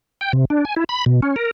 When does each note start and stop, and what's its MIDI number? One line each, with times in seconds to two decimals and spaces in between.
0.21 0.32 79
0.33 0.45 48
0.50 0.65 62
0.65 0.74 80
0.76 0.84 64
0.89 1.04 83
1.06 1.20 47
1.22 1.36 61
1.36 1.51 70